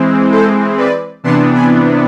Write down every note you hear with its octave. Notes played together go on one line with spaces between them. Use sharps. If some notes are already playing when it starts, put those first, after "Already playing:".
Already playing: E3 G#3 C4
A4 C5
B4 D5
C3 E3 B3 D4 A5 C6
G#5 B5